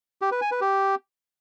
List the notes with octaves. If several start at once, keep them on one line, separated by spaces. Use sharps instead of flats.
G4
B4
G#5
B4
G4